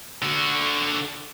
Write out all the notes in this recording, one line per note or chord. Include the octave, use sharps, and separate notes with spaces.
D3 F#4